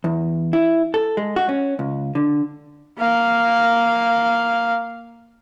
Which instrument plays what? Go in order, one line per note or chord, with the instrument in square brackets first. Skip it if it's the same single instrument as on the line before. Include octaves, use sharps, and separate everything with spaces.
[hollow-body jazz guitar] E2
E4
A4
G#3
F#4
C#4
C#2
D3
[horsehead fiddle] A#3 F5